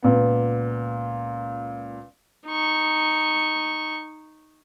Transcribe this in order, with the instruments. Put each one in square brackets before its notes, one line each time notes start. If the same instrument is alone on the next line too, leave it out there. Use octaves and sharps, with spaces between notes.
[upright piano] C#2 A#2 B3
[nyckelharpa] D#4 C#6